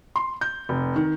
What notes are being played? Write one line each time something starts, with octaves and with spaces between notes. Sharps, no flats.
C6
G6
F1
D#3